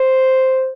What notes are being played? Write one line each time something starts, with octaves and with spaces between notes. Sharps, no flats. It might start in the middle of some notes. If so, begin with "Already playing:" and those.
Already playing: C5